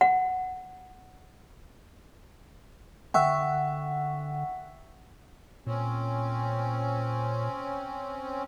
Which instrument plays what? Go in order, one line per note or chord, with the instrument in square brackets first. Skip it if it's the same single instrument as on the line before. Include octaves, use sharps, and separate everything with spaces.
[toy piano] F#5
[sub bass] D3 [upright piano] E5 [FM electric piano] F#5 [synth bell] G5 C#6 E6
[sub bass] A#2 [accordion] C4 C#4